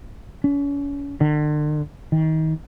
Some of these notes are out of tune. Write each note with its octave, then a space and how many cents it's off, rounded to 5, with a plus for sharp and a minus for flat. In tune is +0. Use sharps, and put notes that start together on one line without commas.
C#4 +35
D3 +40
D#3 +30